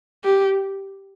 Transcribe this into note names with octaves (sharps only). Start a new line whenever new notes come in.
G4